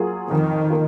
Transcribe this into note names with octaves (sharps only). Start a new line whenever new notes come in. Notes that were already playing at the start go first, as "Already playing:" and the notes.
Already playing: F#3 A#3 F4 G#4
F2 D#3
A#3 F4